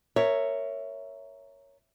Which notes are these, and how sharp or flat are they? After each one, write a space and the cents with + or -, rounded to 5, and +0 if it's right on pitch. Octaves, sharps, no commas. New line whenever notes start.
A#4 -10 C#5 +0 E5 +0